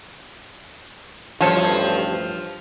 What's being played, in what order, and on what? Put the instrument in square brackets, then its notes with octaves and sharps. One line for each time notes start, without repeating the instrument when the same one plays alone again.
[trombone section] A1 D2 G2 [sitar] F3 [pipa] A4 C#5